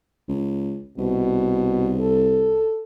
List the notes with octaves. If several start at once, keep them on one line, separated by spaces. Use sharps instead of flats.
C#2
C2 B2
A4